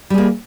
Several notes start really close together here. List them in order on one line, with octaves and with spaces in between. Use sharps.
G3 G#4 A#3